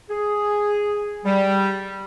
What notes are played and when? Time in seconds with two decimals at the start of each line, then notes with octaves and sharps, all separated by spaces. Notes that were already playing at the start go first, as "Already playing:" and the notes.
0.10 G#4
1.25 G3